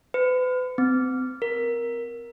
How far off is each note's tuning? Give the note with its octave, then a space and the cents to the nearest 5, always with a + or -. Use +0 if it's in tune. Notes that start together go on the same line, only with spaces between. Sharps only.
B4 +40
C4 -25
A#4 +10